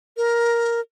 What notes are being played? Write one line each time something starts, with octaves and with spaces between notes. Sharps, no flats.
A#4